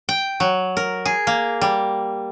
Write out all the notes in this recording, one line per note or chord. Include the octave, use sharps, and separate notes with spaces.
G5
F#3
A#4
G#4
A#3
G3